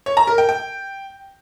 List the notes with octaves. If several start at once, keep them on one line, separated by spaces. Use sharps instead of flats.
C#5
A#5
A#4
G5
G5